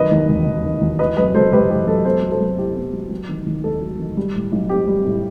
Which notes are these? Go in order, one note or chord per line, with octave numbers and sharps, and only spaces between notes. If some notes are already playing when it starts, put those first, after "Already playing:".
Already playing: F#2 D#3 B4 D#5
D#2
E1
E1
D#3
D#2
E3 B4 D#5
F#2 B4 D#5
F#1 A4 C5
F#1 G4 B4
E3 G4
F#2 A4
B3 A4 C5
F#3
A4 C5
F#2
E4 G4
B3
F#3
F#3
D#3
D#2
A3 A4
F#3
D#3
G3
A2
B1
C4 G4
G3
A2